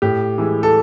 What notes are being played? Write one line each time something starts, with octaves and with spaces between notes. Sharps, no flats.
A2 G4
E3 G#3
A4